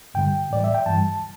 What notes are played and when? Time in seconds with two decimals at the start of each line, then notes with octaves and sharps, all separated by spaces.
0.14 G2 D3 G3 G5
0.50 A2 E3 G3 D5
0.64 E5
0.74 G5
0.86 G2 E3 G3 A5